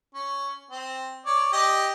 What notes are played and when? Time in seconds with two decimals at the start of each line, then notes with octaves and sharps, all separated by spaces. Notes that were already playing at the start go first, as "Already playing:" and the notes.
0.14 C#4
0.71 C4
1.26 C#5 D5
1.53 G4 D5 D#5